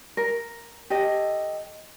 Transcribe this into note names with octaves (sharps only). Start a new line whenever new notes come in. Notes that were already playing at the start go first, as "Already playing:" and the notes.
A#4
G4 A4 D#5